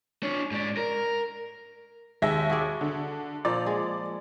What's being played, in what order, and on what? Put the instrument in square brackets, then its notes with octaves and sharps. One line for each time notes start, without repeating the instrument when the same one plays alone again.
[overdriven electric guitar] D4 C#5
G#2 D5
A#4
[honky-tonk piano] D#2 E5 A#6 [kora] G#3
[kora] F#4 G#4 D5
[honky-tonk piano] D3
[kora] A#2 F3 A#3 [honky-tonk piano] D5
[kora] G#3